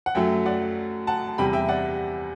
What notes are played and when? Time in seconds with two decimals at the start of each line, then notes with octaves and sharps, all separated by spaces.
0.06 F#5
0.15 F#2 F#3 A3 E5 G5
0.46 D5 F#5
1.07 F#5 A5
1.38 E2 C3 G3 G5 B5
1.53 E5 G5
1.69 D5 F#5